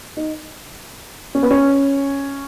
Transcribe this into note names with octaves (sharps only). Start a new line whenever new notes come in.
D#4
C#4
B3
C#4